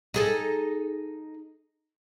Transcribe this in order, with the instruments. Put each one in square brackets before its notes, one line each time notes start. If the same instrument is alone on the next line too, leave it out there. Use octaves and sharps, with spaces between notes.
[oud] D#4 G#4 A4